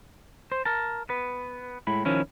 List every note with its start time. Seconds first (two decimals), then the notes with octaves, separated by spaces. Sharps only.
0.52 C5
0.65 A#4 A5
1.09 B3 B4
1.87 A2 G#3 E4 B5
2.05 D#3 F3 C#4 E4